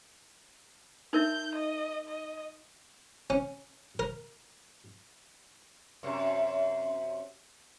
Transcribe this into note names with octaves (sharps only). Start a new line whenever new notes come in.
D#4 A#4 E5 G6
D#5
D#5
C#4
A#4
F#2 C3